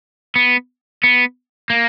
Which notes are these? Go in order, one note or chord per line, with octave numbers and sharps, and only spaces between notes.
B3
B3
A#3